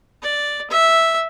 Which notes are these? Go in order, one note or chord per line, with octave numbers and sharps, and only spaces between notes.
D5
E5